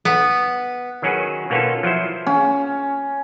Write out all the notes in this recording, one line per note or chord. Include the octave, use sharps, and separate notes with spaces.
B3
D#3 F#3 C#4 F#4 G#4 B4
B2 A#3 B3 C#4 F4 A4
F3 F#3 E4 C5
C#4